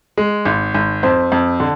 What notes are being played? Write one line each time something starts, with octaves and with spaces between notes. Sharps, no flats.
G#3
G#1
G#1
F2 C5
F2
D3